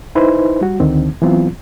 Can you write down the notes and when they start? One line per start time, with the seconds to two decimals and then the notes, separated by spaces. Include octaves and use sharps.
0.15 D#4 E4 B4 C5
0.61 G3 F#4
0.80 D2 D3 D#3 C4
1.22 E3 F#3 B3 C4 F4